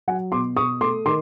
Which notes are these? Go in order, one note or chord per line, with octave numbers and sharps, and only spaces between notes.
F#3 F#5 G#5
B2 C6 D6
B2 C#6 D#6
A3 C6 D6
D#3 C6 D6